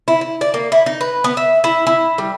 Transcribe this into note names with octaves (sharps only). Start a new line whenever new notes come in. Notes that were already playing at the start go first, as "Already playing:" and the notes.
E4
E4
D5
A#3
E4
D#4
B4
B3
E5
E4
E4
G3